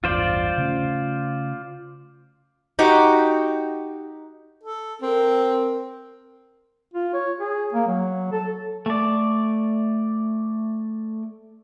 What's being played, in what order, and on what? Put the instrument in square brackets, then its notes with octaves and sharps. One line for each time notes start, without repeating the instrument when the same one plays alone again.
[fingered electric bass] A1 E2 G2 [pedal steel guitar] F4 C5 D5
[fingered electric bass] C#3 A3 C#4
[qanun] D#4 F#4 G4 D6
[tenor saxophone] A4
[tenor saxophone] C4 [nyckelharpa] A#4
[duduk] F4
C#5
G#4
A#3
F#3
A4
[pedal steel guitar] A3 D5